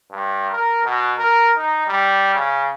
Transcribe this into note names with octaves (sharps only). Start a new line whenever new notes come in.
G2
A#4
B2
A#4
D#4
G3
C#3